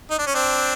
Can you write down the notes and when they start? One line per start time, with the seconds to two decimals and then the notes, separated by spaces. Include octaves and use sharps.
0.10 D#4
0.19 D4
0.27 C#4
0.34 C4 D4